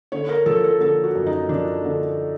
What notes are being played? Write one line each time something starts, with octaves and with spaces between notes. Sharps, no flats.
D3 C#5
A#4
F3 A4
A4
D3 A4
F#4
F#2
D#4
F3 D4
D3